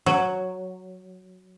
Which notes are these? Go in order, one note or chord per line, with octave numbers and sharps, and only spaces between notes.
F#3